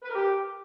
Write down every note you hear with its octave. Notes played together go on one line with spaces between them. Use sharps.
B4
A#4
G4